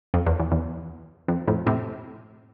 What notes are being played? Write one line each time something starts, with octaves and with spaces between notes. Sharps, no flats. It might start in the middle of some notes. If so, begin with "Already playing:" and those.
F2
E2
E2
E2
F2
F2 A2
A2 C3